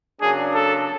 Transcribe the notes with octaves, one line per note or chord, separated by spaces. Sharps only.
C#3 F#3 A#3 D4 G#4
A4